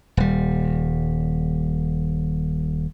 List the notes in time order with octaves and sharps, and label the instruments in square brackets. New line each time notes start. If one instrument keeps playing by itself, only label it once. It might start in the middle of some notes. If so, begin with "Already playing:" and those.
[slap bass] D#1 G3